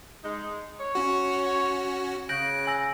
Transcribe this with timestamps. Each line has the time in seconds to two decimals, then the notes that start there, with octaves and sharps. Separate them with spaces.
0.23 G#3 D#4
0.79 C#5
0.95 C#4 F#4
2.29 C#3 F#6 G6 A#6 D7
2.67 G#5 E6 A#6